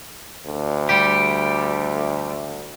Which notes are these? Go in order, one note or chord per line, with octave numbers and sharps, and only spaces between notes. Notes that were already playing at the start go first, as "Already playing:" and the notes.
D2
G3 G4